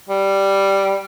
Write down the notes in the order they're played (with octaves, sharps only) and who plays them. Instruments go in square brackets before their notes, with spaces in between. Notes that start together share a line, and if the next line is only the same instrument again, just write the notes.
[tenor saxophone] G3